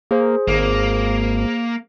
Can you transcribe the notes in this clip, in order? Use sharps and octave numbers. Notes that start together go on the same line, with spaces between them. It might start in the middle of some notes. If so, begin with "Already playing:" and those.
A#3 G#4 C5
G#1 A#3